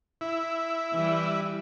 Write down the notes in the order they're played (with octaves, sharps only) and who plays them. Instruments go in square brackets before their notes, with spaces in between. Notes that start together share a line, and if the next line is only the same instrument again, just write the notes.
[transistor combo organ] E4
[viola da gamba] E3 G3